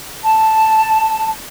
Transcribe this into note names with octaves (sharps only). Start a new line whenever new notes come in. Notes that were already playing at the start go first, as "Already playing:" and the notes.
A5